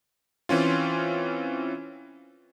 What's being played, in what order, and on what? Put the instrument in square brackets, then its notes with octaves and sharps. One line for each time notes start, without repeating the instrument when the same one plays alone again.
[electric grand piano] E3 C4 C#4 F4